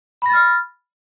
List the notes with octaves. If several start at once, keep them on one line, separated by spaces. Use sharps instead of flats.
B5 F6 A6 A#6